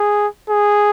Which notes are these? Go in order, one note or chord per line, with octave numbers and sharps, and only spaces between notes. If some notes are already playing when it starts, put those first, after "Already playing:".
Already playing: G#4
G#4